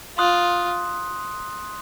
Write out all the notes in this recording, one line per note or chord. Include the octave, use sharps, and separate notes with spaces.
F4 C6 D#6 F#6